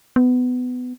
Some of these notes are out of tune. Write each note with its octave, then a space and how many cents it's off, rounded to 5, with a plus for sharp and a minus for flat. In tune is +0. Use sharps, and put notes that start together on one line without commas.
B3 +20